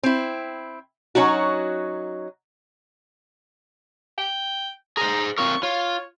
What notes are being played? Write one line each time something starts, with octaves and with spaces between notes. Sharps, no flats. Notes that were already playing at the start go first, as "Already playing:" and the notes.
C4 E4
F#3 C#4 D#4 F#4
G5
G#4 C5 A#5
C4 F4 A#4 C#6
F4 C#5